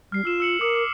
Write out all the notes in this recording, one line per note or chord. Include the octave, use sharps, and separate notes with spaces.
G3 F6 C7
F4 E6 E7
E6 C#7 F#7
A#4 D6 D#6 C#7
D6